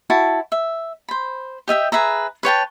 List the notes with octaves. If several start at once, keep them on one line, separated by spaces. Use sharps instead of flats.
E4 F#4 A5
E5
C5 B5
G4 D#5 E5 G5
G#4 B4 E5 A#5
B4 C#5 G5 A5